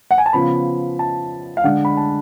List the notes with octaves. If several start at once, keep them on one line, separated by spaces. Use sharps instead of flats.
F#5
G#5
A5
C#3 F3 B3 B5
A5
F5
D3 G#3 D4 F#5
B5
A5